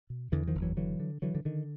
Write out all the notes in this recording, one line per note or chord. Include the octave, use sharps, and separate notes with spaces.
B2
E2 D3 E3
D#3 F3
F#1
E3 F#3
D3 E3 F#3
D3
D3 E3 F#3
D3
D3 D#3